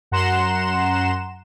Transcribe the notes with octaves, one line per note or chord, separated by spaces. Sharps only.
F#2 F#5 A#5 C6 E7